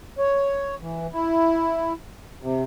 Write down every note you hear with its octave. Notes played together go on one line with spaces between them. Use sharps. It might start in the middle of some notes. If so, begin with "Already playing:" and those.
C#5
E3
E4
C3